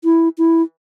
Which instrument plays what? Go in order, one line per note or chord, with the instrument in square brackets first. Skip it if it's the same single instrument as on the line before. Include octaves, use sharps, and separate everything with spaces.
[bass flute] E4
E4